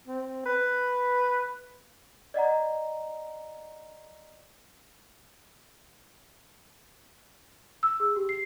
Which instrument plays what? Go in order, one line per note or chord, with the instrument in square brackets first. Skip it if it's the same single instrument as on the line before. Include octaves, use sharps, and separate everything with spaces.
[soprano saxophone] C4
B4
[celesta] D5 D#5 F#5 A#5
E6
G#4
G4
C7